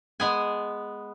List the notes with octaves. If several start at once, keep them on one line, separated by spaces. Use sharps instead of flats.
G#3 B3 G#5